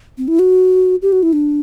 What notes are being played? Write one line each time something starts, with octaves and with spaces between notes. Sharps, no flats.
C4
E4
F#4
G4
F#4
E4
D4